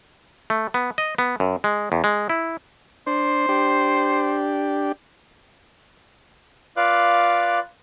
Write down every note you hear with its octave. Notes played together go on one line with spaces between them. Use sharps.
A3
B3
D#5
B3
F#2
G#3
E2
G#3
E4
D4 C5
D4 G4
F4 B4 D5 F5 D6 F#6